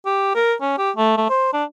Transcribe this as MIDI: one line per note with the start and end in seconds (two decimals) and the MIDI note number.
0.06 0.32 67
0.35 0.54 70
0.61 0.74 61
0.78 0.91 67
0.97 1.15 57
1.17 1.26 57
1.29 1.50 72
1.53 1.64 62